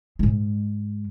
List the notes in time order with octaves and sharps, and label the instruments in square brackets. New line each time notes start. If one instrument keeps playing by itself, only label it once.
[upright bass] G#2 G#3